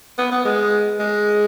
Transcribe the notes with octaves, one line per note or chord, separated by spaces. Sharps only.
B3
B3
G#3
G#3